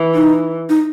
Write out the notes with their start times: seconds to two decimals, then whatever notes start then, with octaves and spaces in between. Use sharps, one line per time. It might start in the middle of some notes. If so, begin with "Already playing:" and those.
Already playing: E3
0.14 D#4
0.69 D#4